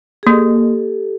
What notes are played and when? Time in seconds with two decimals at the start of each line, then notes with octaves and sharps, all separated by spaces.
0.23 G#4
0.26 A#3 G4 A4